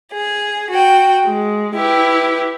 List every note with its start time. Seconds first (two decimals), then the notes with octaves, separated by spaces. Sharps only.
0.13 G#4
0.71 F#4 G5
1.27 G#3
1.76 E4 G4 B4